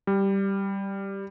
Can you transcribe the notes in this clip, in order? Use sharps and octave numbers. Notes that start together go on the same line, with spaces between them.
G3